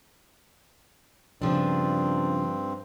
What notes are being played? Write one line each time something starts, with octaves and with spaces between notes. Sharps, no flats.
G2 C#3 F3 C4 D4